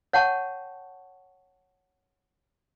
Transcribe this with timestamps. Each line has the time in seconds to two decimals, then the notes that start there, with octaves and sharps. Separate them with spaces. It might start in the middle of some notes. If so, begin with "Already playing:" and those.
0.13 C#5 F#5 G5 A5 C#6